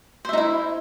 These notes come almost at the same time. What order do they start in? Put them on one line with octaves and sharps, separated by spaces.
C5 E5 D#4 E4